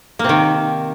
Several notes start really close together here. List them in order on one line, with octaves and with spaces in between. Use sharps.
A#3 C3 D#3